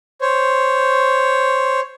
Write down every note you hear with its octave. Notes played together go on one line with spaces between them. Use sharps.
C5 C#5